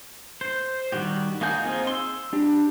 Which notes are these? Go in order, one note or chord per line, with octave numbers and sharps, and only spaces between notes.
C5
D#3 G3 F#4 G4
A#3 D#4 F#4 G#5 G6
C4 D#4 F4 G#4
C6 E6
D4 G4